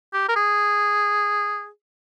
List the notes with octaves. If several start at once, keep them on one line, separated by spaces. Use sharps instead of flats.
G4
A#4
G#4